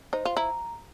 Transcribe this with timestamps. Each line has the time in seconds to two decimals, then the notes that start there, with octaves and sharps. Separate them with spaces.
0.13 D#4 C5
0.25 F4
0.37 E4 A#5